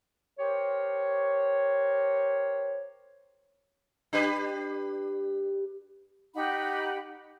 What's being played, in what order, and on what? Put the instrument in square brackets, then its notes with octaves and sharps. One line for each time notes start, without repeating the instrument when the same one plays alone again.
[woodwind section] G4 A#4 C5 C#5
[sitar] D4 G4 B4
[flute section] D#4 G4 F#5 B5